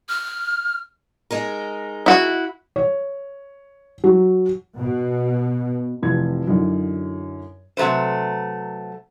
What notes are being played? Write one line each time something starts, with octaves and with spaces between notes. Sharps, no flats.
F6
G#3 D#4 A#4
E4 F#4
C#5
F#3
B2
F1 C3 E3 F3 G#6
F#2 D3 F#3 D#4 E4
C3 F#3 A3 B4 C5